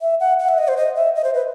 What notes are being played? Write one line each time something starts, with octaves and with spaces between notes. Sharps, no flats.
E5
F#5
F#5
E5
D#5
C5
D#5
E5
D#5
C5
B4